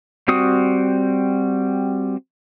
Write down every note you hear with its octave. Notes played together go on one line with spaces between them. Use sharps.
G3 C4 F#4 D#6